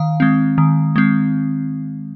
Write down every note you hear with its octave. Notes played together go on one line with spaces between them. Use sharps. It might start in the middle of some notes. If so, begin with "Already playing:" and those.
Already playing: D#3 F5
G#3 C4
D#3
G#3 C4